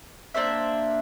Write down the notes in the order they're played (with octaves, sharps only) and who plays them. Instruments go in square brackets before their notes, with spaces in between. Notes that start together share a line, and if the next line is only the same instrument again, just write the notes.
[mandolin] A#3 D4 C5 E5